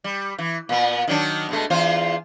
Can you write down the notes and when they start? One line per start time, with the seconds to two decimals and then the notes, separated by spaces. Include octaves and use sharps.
0.04 G3
0.38 E3
0.69 A#2 B3
1.08 D#3 F#3 D4
1.49 B2 G#3 A3
1.70 E2 F4 C5